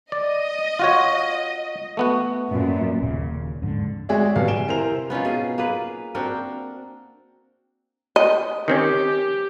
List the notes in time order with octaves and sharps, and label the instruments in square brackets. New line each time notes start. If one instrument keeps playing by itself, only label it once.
[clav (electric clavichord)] D5 [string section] D#5
[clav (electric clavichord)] F4 F#4 C#5
A3 B3 F#4
[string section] F#2 A#2
[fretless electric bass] D#1 D#2 A#2 C#3
F2 G#2 D3
[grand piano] G#3 F#4 G#4 C#5 D5 E5
F1 B2 G3 B3 F#4 F5
G#5 D7 E7 G7
C3 E4 A#4 C5 G#5 F7
[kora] B3 C#4 D#4 F4
B2 G#4
A#3 G#4 B4
C4 D4 F#4 A#4
[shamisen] D#5
[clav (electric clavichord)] D#3 C4 C#4 [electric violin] G4